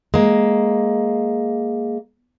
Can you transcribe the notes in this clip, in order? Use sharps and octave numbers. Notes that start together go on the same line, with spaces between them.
G#3 A#3